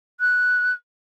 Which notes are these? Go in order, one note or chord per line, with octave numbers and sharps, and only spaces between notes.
F#6